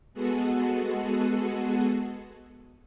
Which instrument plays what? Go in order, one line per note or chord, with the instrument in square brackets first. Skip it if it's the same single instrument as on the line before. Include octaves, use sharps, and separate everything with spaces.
[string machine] G#3 B3 F#4 G#4 A4